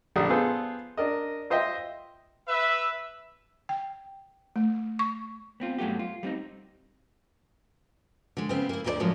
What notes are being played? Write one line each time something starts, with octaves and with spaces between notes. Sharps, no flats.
A#1 D3 G3 D4 D#6
B3 F4 G#4 A4 C5
D4 A#4 D#5
F4 C5 D#5 E5 G5
B4 E5
G5
A3
C#6
B3 C4 F4
G2 F#3 A3 B3 G4
F4
G3 B3 C4 D#4
D3 G#3
C#3 B3 C4
A#3 E4
D2 A#2 D3 A#4 C5 D5
A2 D3 F3 F#3 G#3 A#3